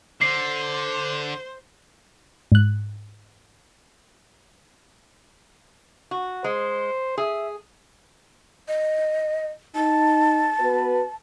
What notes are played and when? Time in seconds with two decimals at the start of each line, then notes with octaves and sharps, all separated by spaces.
0.21 D3 C5 C7
2.52 G#2 F#6
6.11 F#4
6.44 G#3 C5
7.18 G#4 E5
8.68 D#5
9.75 D#4 A5
10.58 B3 F#4 B4